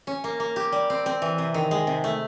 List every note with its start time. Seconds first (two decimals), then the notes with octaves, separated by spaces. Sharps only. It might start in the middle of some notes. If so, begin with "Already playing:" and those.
0.07 C#4
0.24 A#3
0.40 A#3
0.56 G4
0.72 G3
0.90 C4
1.06 C4
1.22 E3
1.38 C3
1.54 D#3
1.71 G#3
1.87 C3
2.04 A3